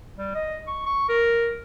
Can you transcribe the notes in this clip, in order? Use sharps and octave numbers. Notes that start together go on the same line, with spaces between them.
G3
D#5
C#6
C#6
A#4